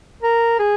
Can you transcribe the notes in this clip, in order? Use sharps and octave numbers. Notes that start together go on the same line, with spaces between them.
A#4
G#4